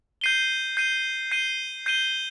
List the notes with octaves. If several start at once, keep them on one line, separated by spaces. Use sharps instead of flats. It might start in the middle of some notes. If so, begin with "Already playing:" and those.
G6 C7 D#7 G7
G6 C7 D#7 G7
G6 C7 D#7 G7
G6 C7 D#7 G7